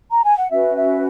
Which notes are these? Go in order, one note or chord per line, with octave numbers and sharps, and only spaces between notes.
A#5
G#5
F#5
C#4 F#4 B4 E5
E5